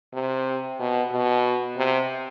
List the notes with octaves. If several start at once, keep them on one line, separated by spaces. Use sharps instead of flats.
C3
B2
B2
C3